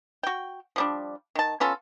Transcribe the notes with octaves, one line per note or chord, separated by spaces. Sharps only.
F#4 G5
F3 G3 D4
D#3 A5
B3 C#4 F4 A4